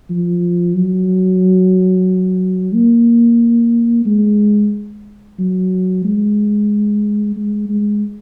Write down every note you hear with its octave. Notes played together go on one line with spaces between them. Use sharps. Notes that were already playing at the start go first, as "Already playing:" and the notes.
F3
F#3
A#3
G#3
F#3
G#3
G#3
G#3